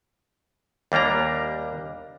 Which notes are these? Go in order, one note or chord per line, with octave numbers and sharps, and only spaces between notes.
D#2 G3 A#3 D4 A#5